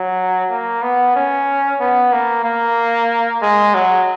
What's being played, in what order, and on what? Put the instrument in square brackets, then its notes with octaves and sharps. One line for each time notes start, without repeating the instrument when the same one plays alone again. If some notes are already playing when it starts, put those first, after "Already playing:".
Already playing: [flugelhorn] F#3
A#3
B3
C#4
B3
A#3
A#3
G#3
F#3